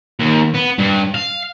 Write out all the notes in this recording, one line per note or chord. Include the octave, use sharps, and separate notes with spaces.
D#2
B3
G2
F5